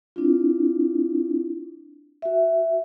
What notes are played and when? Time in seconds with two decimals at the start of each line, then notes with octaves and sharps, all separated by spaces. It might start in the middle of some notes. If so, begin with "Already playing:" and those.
0.16 C4 D4 E4 F4
2.22 F#4 E5